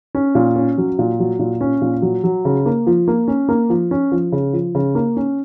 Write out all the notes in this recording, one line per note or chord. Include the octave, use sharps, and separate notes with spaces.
C#4
A#2
C#4
F#3
A#2
F#3
A#2
C#4
A#2
F#3
F#3
C#3
A#3
F3
A#3
C#4
A#3
F3
C#4
F3
C#3
F3
C#3
A#3
C#4